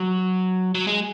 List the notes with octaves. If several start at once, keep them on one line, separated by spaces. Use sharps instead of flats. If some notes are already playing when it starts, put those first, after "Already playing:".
Already playing: F#3
F#3
G#3